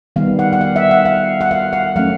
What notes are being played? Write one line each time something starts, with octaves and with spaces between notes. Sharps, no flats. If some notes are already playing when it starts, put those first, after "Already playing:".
D#3 G3 B3 F5
F#5
F#5
F5
E5
F#5
F5
F#5
F5
F#5
F#3 A3 C#4 F5